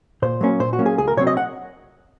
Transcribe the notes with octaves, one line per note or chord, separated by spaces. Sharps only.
A#2 C5
F#3 A#3 C#4
A#2 C5
F#4
F#3 A#3 C#4
G#4
C#2 G#4
A#4
C3 F#3 C4 C#5
D#5
F#5